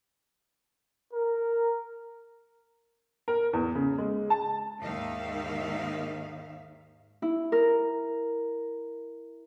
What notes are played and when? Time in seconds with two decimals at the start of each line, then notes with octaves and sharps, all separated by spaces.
1.13 A#4
3.28 A#4
3.53 E2
3.75 C#3
3.98 G#3
4.30 A5
4.82 D#2 G#2 D#3 E5 F5
7.22 E4
7.52 A#4